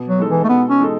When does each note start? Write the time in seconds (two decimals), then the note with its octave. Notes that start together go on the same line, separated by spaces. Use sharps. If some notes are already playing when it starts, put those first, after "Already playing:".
Already playing: B2
0.08 F#3
0.19 G#3 D#4 A4
0.30 E3
0.44 A3
0.49 B2 B3
0.70 C#4
0.81 G#3 D#4 A4